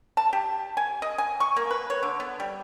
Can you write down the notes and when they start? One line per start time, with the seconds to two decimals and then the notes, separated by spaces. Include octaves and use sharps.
0.17 A5
0.33 G4
0.77 G#5
1.02 D#5
1.18 G#5
1.40 C#6
1.56 A#3
1.71 B4
1.90 C#5
2.03 D3
2.20 B3
2.40 G3